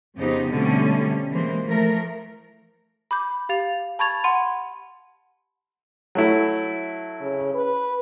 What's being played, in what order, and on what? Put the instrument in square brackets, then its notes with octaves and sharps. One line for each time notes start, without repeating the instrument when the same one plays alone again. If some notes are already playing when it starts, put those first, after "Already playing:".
[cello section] F2 C#3 B3 D#4 G4 C5
B2 D3 G3 A3 C4 C#4
E3 G3 G#3 A#3 C5
E3 F3 A3 A#4
[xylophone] B5 D6 G6
G4 F5 A6 F7
A5 B5 C#6 G#6 A6 F7
F#5 B5 C6 D#7
[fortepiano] F#3 A3 E4
[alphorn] C#3
B4